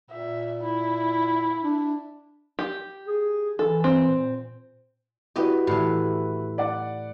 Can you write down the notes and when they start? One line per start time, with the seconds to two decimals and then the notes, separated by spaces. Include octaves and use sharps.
0.10 A#2 E5
0.61 E4
1.63 D4
2.59 G4
3.07 G#4
3.59 E3 A4
3.84 C4
4.09 A#2
5.36 E4 F#4 G4 B4 D#5
5.67 A2 E3
6.58 D5 F#5